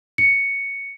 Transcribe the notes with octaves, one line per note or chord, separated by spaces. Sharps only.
C#7